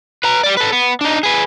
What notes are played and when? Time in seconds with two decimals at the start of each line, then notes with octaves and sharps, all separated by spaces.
0.23 B4 A#5
0.43 G3 D5
0.57 A4 B4
0.72 B3
1.01 D4 D#4
1.23 G#4 B4